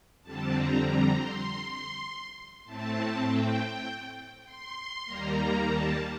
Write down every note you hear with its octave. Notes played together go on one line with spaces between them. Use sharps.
F2 D3 G3 C4 A5
A#5
A#5
C6
A2 A3 C4 A5
G5
C6
D#2 D#3 G3 A#3 A#5
A5